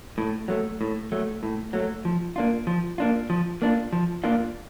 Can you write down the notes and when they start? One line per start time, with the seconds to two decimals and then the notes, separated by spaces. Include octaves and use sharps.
0.18 A2
0.48 F#3 A3
0.81 A2
1.12 F#3 A3
1.43 A2
1.73 F#3 A3
2.05 F3
2.36 A#3 D4 F4
2.67 F3
2.98 A#3 D4 F4
3.30 F3
3.62 A#3 D4 F4
3.93 F3
4.24 A#3 D4 F4